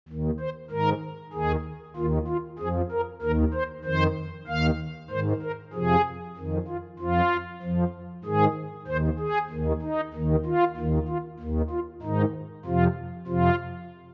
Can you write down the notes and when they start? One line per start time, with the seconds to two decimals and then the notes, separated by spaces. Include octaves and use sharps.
0.09 D#2 D#3
0.40 C5
0.70 G#2 D#3 A#4
1.33 D#2 D#3 G#4
1.97 D#2 D#3 F4
2.28 F4
2.59 F2 F3 G#4
2.91 A#4
3.22 D#2 D#3 A#4
3.54 C5
3.85 F2 D#3 C5
4.47 D#2 D#3 F5
5.10 G#2 D#3 C5
5.42 A#4
5.73 F2 C3 F3 G#4
6.37 F2 D#3
6.68 F4
6.99 F2 F3 F4
7.62 F2 F3
8.24 G#2 D#3 G#4
8.87 D#2 D#3 C5
9.20 G#4
9.50 D#2 D#3
9.82 D#4
10.14 D#2 D#3
10.46 F4
10.77 D#2 D#3
11.08 F4
11.40 D#2 D#3
11.71 F4
12.02 G#2 D#3 D#4
12.65 F2 C3 F3 F4
13.27 F2 C3 F3 F4